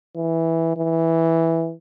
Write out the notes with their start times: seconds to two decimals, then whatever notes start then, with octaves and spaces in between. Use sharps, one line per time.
0.16 E3
0.77 E3